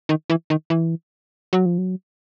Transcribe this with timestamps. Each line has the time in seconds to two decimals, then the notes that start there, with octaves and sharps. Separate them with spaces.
0.09 D#3
0.30 E3
0.50 D#3
0.70 E3
1.53 F#3
1.66 F3
1.78 F#3